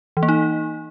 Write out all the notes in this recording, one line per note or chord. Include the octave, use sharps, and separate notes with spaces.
E3
A#3
D#4